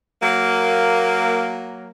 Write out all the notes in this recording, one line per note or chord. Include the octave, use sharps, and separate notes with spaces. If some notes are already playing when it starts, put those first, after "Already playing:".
F#3 A#3